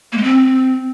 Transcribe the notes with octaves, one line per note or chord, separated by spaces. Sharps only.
A#3
G#3
C4